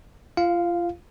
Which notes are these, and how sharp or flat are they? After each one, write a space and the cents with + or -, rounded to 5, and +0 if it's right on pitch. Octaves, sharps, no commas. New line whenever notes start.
F4 -30 F5 +0